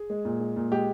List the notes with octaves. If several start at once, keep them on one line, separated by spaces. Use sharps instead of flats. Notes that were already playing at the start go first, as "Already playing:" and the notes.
Already playing: G#4
G#3
A#2
G#3
A#2
G#3 G4